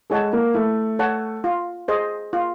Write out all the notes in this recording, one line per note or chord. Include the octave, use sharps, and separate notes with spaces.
G#3 A4 C#5 F#5 A5
A#3
A3 E4
A4 C#5 F#5 A5
F4
G#4 C5 D#5
F4